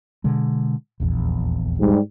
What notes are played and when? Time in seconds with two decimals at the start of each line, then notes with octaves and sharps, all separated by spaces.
0.24 B2 D3 G#3
1.00 D#1 A#1 E2
1.79 G#2 G3